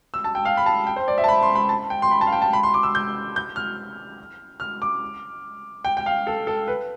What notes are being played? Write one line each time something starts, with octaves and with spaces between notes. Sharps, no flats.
E6
A5
G5
F5
B5
A5
G5
C5
D5
E5
A5
B5
C6
B5
A5
G5
C6
B5
A5
F5
G5
A5
B5
C6
D6
E6
G6
G6
F6
F6
D6
G5
G5
F5
A4
A4
B4